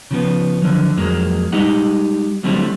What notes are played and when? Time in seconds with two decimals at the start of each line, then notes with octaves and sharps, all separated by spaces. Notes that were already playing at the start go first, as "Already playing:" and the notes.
0.11 C#3 F3 B3
0.62 D3 F3 F#3
0.97 F2 F#3 G#3 A#3
1.52 G3 G#3 D#4 G4 D#5 F#5
2.43 D3 F#3 G3 A3 C4 E4